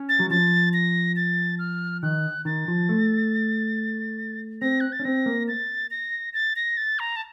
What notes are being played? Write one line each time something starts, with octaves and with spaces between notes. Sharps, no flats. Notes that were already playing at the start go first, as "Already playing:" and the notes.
Already playing: C#4
A6
F#3
F3 A6
A#6
A6
F6
D#3 F#6
D#3 A6
F3
A3
C4 A#6
F#6
A6
C#4
C4 A#6
A#3
A6
A#6
A6
A#6
A6
A#5
A5